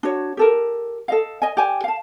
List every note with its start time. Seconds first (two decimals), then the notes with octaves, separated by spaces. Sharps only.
0.03 D4 F#4 C#5
0.37 G4 A4 A#4
1.08 A4 D#5 F5
1.42 D#5 G#5
1.57 G4 D5 G#5
1.84 F5 A5